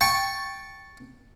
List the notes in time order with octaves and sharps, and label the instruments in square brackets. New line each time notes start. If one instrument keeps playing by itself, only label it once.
[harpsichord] G5 A5 C#6